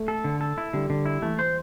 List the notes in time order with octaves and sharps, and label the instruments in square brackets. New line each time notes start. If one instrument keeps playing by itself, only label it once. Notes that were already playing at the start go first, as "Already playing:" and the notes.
Already playing: [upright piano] A3
[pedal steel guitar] A4
D3
A4
E4
[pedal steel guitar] D3 [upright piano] G3
[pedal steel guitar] D3
E4
[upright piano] E3 [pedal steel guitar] A3
[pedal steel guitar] C5